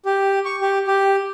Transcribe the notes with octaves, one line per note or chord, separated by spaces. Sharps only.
G4
C#6
G4
G4